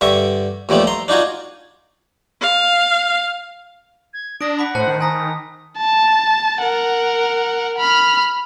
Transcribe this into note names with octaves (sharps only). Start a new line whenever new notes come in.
G2 D3 E5 C#6
D#2 F3 G3 A3 B3
A#5 C6
D4 D#4 F4 F#4 G#4
F5
G#6
D4 D#6 A#6 D7
F#5 B5 D6 B6
A2 C5 A5 F#6 C#7
D#3
G#5 A#5 D#6 A#6 B6
A5
A#4 F#5
B5 F6